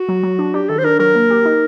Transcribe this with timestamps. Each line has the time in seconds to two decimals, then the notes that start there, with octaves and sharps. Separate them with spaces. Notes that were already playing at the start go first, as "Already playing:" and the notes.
Already playing: F#4
0.09 F#3
0.23 F#3
0.39 D4
0.54 D4 G4
0.69 D#3 A4
0.78 C5
0.85 D4 A#4
0.99 F#3 A#4
1.15 A#3
1.30 G4
1.45 D#4